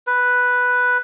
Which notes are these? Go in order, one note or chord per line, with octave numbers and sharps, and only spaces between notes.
B4